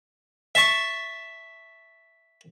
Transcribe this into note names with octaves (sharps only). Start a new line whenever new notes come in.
E5 A5 C#6